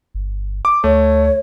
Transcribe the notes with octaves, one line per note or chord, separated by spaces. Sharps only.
G1
D6
D2 A3 C#5